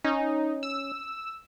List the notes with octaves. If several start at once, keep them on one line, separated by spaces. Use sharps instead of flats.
C#4 D#4
E6